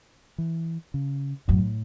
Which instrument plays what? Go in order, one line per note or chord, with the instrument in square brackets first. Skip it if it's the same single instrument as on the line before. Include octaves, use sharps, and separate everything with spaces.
[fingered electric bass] E3
C#3
[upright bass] F#2 [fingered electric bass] A2